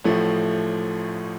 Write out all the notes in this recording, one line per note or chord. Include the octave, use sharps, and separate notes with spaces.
A1 A2 F3 A3